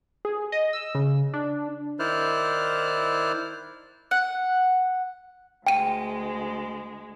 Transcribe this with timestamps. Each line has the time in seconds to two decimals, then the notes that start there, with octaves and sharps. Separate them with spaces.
0.25 G#4
0.52 D#5
0.73 E6
0.95 C#3
1.34 D4
1.99 D#3 E4 C5 D5 F6 F#6
4.11 F#5
5.67 D2 G#3 G5 D#7